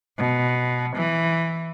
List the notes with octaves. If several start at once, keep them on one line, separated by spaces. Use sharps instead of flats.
B2
E3